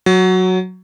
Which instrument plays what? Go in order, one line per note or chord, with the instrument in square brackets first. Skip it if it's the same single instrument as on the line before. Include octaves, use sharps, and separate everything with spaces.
[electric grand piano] F#3